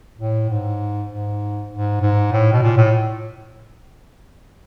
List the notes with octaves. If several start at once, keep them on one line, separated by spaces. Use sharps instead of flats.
A2
G#2
G#2
G#2
G#2
A2
B2
A#2
A2